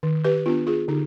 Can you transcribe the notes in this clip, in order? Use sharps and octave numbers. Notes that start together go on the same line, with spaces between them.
D#3
G4 B4
B3 D4 F4
F4 G#4
D3 D#4 G4